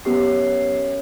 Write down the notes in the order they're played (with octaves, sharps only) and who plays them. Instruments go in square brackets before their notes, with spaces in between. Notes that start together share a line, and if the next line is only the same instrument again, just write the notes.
[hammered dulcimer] F#2 [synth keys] B3 G4 C7